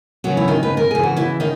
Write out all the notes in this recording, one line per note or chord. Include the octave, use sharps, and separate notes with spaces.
C#3 E3 F#3 F#4
E4
D#3 D#4
B4
A#4
C#3 E3 G#4
F#4
E3 E4
D#3 D#4